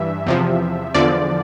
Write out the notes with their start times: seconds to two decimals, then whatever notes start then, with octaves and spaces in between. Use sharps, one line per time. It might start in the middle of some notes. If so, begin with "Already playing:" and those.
Already playing: G2 E3 E5
0.26 E2 C3 F3
0.94 E2 D3 F3 D5